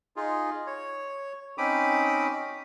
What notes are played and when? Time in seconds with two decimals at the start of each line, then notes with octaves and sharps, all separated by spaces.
0.16 D#4 F4 G#4
0.67 C#5
1.58 C4 C#4 D#4 B5 D6 D#6